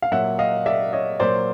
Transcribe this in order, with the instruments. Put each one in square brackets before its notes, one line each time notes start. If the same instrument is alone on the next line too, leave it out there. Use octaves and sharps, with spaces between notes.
[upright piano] F5
A#2 F#3 E5 F#5
D#5 F5
D5 E5
C#5 D#5
A#2 F#3 C5 D5